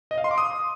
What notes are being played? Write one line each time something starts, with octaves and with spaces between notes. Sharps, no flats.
D#5
F5
C6
D6
D#6